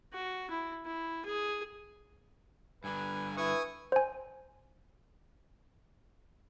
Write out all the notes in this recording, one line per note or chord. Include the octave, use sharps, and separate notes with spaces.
F#4
E4
E4
G#4
G2 D3 B4 G#5
E4 B4 G#5 C#6 D#6
C5 G#5